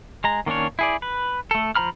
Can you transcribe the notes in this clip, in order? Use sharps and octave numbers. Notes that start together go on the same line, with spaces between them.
G#3 A#5
D#3 A#3 C#4 D4 C#5
E4 G#4 D5
B4
A3 A4
F3 C5 A#5 B5 F6